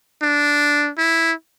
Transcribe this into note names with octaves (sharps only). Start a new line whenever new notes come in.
D4
E4